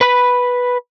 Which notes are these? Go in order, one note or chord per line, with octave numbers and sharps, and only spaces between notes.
B4 B5